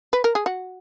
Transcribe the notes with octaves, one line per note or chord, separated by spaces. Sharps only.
B4
A#4
G#4
F#4